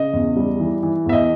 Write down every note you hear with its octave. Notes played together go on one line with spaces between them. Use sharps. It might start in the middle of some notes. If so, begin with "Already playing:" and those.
Already playing: C#3 D#5
E2
G3
E3
E3
E2 E5
D#5